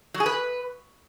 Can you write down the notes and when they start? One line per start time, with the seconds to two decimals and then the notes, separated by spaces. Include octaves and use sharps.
0.14 F#3
0.20 G#4
0.26 B4